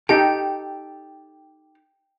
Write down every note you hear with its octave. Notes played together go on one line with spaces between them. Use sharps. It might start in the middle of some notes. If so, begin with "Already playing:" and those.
D#4 G4 A4 G5